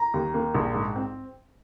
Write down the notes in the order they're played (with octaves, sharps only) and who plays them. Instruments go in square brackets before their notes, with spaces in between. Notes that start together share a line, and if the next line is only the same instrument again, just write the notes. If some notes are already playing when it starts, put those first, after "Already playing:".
Already playing: [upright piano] A#5
D#2
A#3
A#1
G#2
C4